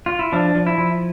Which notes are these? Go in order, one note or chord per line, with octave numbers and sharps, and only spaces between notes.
F4
E4
F3 D4
F3
E4
F3